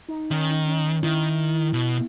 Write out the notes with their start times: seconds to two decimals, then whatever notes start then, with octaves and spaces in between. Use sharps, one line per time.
0.08 D#4
0.31 D#3 C#4
0.50 D#4
0.68 C#4
0.85 C#4
1.03 D#3 E4
1.73 B2